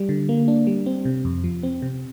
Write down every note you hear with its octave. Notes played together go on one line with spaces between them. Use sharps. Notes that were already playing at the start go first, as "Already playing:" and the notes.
Already playing: G3
D3
A#3
D4
G3
C4
C3
F2
F3
C4
C3